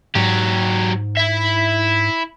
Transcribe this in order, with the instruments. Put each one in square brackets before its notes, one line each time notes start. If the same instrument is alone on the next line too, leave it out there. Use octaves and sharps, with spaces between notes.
[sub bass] G#2 [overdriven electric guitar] F#3 G4
[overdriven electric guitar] E4 E5